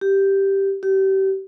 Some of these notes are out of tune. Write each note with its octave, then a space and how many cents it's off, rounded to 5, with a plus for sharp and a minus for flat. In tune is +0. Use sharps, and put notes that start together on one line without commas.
G4 -5
G4 -30